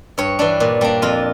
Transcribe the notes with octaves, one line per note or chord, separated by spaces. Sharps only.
G2 C#5
E3 G3 D4
A#2
G3 A#3 D4
F2 F4